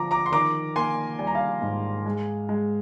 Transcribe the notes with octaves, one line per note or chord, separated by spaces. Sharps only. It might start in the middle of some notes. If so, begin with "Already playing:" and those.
Already playing: D3 F3 A#5 D6
A#5 D6
C6
D#3 A#5 D6
A#3 G#5 C6
G3 G#5
A#5
F5 G#5
G#2
G#3
G#3